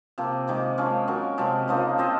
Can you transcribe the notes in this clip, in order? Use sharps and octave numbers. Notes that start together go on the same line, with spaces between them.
C3 F3 A#3
C3 D#3 G#3
F3 G#3 C#4
F#3 C#4 F#4 A#4
C3 F3 G#3
C#3 F3 A#3 D#4
C4 F4 C5 D#5